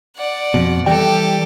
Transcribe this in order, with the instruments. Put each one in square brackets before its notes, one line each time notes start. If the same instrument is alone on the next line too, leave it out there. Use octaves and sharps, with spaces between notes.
[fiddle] D5 F#5
[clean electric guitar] F2 B2
[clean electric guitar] E3 G3 G5 [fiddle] G4 A4